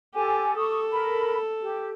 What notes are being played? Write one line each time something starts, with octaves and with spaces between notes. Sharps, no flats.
G4 A4 G#5
A4 C#6 D#6
A#4 B5
G4